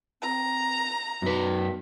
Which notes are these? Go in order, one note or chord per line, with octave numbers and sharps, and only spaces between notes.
C4 A#5
F#2 B2 D#4 B4